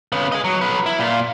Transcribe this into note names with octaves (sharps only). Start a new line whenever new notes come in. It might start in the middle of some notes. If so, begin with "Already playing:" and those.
C#3 B3
G#4 D#5
F#3
F#3 B4
E4
A#2 F4